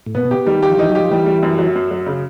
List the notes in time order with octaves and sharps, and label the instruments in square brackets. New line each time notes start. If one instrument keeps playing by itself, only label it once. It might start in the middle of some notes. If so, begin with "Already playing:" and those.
[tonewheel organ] A2
[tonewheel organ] A#2 [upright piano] B3
[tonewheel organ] B2
[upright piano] G4
[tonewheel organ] D#3 [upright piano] G3
[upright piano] G4
[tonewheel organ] F3
[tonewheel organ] E3 [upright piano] D#4
[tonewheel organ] F#3
[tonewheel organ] F3 [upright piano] G4
[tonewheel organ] E3 [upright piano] G3
[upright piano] G3
F#2
F#3
F#2
F#3
C#3